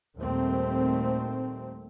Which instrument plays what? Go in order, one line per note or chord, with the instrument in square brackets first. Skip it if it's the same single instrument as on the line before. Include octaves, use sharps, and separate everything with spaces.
[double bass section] D#2 A#2 G3 A3 C4